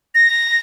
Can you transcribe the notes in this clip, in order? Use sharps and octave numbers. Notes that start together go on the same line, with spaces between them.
A#6